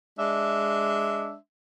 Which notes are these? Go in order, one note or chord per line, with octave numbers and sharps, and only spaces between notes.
G#3 D4 E5